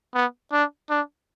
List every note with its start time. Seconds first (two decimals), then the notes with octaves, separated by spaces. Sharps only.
0.15 B3
0.52 D4
0.90 D4